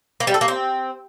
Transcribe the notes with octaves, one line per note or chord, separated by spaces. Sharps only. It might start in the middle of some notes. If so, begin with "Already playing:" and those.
A#3
G3
A4
A#3
C4